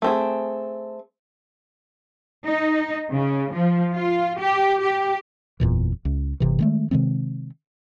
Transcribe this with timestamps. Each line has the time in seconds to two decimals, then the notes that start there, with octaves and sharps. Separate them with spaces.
0.02 A3 C4 G#4
2.46 D#4
3.12 C#3
3.54 F3
3.95 F4
4.39 G4
4.82 G4
5.60 F#1 E2 A#2 E3
6.05 C#2
6.40 G1 C3 E3
6.59 D#3 G#3 A3
6.91 C3 D#3 G#3 C4